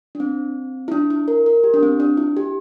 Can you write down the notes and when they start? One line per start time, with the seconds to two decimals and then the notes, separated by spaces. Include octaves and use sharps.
0.15 D4
0.20 C4
0.88 E4
0.92 D4
1.10 E4
1.28 A#4
1.46 A#4
1.64 G4
1.74 D4
1.83 C4
2.00 D4
2.17 E4
2.37 G4